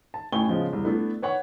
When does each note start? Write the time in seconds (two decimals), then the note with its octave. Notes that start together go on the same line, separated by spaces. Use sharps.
0.14 A5
0.32 A1 A2 G5 G#5 C#6 G7
0.48 C#3 F3 G#3 B3
0.73 E1 C2
0.84 A3 B3 D4 E4 A4
1.22 B4 C#5 F#5 C#6